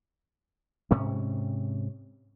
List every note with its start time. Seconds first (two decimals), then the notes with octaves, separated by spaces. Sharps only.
0.91 G#2 C3 C#4